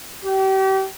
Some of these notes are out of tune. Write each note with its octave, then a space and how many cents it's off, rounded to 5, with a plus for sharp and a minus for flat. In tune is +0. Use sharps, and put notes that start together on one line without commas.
G4 -35